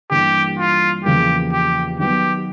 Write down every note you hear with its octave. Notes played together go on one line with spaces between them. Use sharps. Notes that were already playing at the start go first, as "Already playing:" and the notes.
G2 E3 G3 A#3 G4
F4
E2 C#3 F3 A#3 G4
G4
D#3 F#3 B3 G4